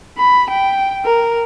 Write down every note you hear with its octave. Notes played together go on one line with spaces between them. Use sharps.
B5
G5
A#4